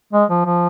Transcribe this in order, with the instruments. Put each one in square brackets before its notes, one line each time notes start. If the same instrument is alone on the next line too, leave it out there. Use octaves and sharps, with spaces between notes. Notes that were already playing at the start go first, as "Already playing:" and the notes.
[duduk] G#3
F3
F3